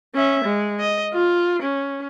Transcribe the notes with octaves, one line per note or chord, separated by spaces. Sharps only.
C#4 E5
G#3
D#5
F4
C#4